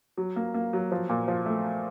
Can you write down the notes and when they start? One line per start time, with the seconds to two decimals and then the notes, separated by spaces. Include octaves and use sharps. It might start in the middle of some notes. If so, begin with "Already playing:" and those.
0.18 F#3
0.36 A#3
0.54 A#3
0.73 F#3
0.92 F3
1.09 A#2
1.28 F3
1.46 A3